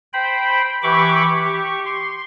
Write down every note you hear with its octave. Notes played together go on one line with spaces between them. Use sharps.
C5 G5 B5
E3 G4 B5 C#6 D6
G4 C#6
C6